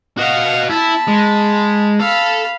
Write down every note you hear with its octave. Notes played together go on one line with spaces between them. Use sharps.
F#4 D#5 F5 F#5
E4 A5 B5
G#3
A4 F5 B5